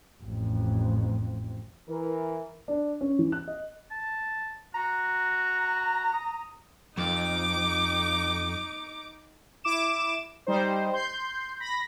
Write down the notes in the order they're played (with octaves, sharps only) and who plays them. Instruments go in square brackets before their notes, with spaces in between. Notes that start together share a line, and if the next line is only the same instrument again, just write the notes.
[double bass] A1 F2
[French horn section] E3 A#4
[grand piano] D4
C#4
E3
F#6
D#5
[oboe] A5
[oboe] F#4 [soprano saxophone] A#5
[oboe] D#6
[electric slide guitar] F2 [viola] D#4 D6
[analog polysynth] E4 D6 E7
G3 D#4 C5
C6 G6
B5 A#6